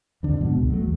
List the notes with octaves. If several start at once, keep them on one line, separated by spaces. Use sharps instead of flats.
F2 D3
G#2 B2
C#2
F#3 A3
E2